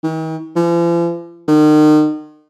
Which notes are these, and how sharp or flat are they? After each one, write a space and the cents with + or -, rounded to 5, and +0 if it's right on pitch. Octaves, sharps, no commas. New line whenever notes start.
D#3 +45
F3 -45
D#3 -35